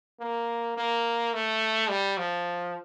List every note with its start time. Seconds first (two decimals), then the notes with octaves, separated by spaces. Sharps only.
0.20 A#3
0.77 A#3
1.33 A3
1.89 G3
2.18 F3